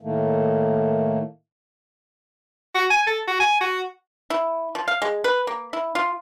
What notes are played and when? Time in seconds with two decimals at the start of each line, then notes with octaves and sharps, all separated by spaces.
0.01 A2 D#3 A3 A#3
2.75 F#4
2.90 G#5
3.07 A4
3.27 F#4
3.40 G#5
3.61 F#4
4.30 E4
4.75 F3
4.88 F5
5.02 G#3
5.24 B4
5.47 A#3
5.73 E4
5.95 F4